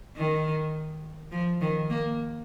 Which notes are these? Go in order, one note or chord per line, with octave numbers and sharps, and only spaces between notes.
D#3
F3
D#3
A#3